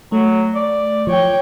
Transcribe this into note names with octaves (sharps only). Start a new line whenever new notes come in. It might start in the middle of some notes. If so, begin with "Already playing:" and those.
F#3 A3
D5
F3 C#5 G5